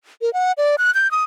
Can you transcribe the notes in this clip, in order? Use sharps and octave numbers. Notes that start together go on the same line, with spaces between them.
A#4
F#5
D5
F#6
G6
D#6